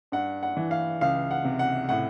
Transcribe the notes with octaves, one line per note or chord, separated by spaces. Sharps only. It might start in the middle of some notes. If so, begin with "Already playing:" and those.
G2 F#5
F#5
E3
F5
C#2 F5
F#5
C3
F#5
A2 F#5